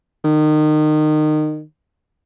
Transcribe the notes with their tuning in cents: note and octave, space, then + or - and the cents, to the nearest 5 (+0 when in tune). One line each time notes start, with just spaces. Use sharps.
D#3 -25